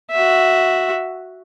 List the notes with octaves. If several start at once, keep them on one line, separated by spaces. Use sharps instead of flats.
F#4 E5